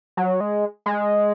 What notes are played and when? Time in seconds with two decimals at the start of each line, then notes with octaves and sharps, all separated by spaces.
0.17 F#3
0.41 G#3
0.86 G#3